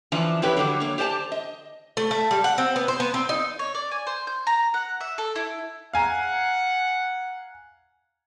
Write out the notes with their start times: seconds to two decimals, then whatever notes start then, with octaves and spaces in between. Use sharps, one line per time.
0.12 E3 F3 D4 F4
0.42 F3 B3 E4 G4 B4 C#5
0.57 D3 D#3 F#3 G3
0.80 A#3 C#5
0.98 G4 C5 D5 G5 A5
1.32 D#5
1.97 A3
2.11 A3
2.31 G3
2.44 F#5
2.58 C4
2.76 B3
2.88 C5
3.00 B3
3.14 C4
3.29 D#4
3.59 C#5
3.75 D5
3.91 G#5
4.07 C5
4.27 G6
4.47 A#5
4.74 F#5
5.01 E5
5.18 A4
5.36 E4
5.93 F5 F#5 G#5 A#5